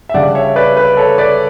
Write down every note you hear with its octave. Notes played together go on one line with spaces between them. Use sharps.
E5
C#3 G3 D4 D5 F#5
C#5 E5
B4 D5
B4
A4 C#5
B4 D5